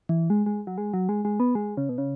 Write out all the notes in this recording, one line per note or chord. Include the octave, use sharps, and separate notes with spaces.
E3
G#3
G#3
F#3
G#3
F#3
G#3
G#3
B3
G#3
C#3
B2
C#3